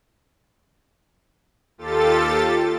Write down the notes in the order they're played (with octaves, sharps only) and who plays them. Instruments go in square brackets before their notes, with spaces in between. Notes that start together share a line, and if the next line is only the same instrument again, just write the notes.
[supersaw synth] D#2 F4 G4 A4 A6